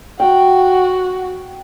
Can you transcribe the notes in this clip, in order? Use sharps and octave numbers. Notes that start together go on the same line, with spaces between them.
F#4 G5